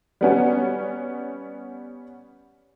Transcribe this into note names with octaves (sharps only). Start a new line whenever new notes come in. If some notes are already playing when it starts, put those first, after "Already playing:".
G3 B3 C#4